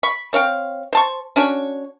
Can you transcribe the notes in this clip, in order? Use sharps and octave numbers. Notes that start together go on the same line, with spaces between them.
B5 C#6
C4 C#5 F5 G5
C5 A5 C#6
C#4 D4 F#4 C#5